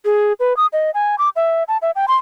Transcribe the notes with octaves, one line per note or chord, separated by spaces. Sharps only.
G#4
B4
D#6
D#5
G#5
D6
E5
A5
E5
G5
C6